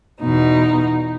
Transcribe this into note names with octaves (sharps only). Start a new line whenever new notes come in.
E2 B2 D#4